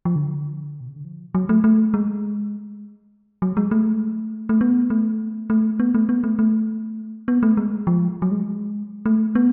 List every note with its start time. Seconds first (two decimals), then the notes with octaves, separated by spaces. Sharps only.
0.05 F3
0.16 D3
0.81 B2
0.89 C#3
0.96 D3
1.05 F3
1.35 F#3
1.49 A3
1.64 A3
1.94 G#3
3.42 F#3
3.57 G#3
3.71 A3
4.49 A3
4.61 B3
4.90 A3
5.50 A3
5.80 B3
5.94 A3
6.09 B3
6.24 A3
6.39 A3
7.28 B3
7.43 A3
7.57 G#3
7.87 F3
8.22 F#3
8.31 G#3
9.06 A3
9.35 B3